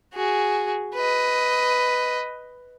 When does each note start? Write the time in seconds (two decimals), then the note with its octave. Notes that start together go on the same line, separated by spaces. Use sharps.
0.14 F#4 G#4
0.95 B4 D#5